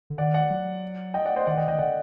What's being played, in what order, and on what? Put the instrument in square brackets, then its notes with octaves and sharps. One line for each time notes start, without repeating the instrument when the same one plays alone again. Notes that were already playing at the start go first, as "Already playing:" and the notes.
[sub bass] D3
[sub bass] D#3 [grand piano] D5 F#5
[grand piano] D5 F#5
[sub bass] F#3
[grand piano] D#5 G5
D5 F#5
C5 D#5
[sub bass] D#3 [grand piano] D5 F#5
[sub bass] D#3 [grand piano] D#5 G5
[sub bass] D#3 [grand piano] D#5 G5
[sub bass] D3 [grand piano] D5 F#5